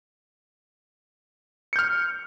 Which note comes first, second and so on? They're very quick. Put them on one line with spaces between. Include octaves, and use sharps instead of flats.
C#7 G6 F6